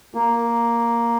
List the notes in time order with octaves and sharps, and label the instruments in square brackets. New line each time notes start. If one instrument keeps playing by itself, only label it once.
[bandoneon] A#3